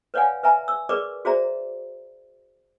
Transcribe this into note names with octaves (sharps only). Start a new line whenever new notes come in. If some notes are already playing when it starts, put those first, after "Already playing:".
B4 C#5 D5 F5 F#5 G#5
B4 E5 G#5 A#5
E6
G#4 A#4 B4 D5 C#6 D6
F#4 G#4 C5 D5 E5 A#5